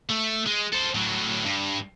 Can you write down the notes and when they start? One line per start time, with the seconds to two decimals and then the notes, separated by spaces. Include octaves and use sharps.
0.09 A3
0.46 G#3
0.73 A4 C5
0.95 A2 F#3
1.44 G2